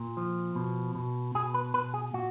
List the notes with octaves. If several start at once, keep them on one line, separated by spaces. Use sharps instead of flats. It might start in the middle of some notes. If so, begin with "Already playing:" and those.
Already playing: A#2
F3
B2
B2
B2 G#4
B4
B2 B4
G#4
A#2 F#4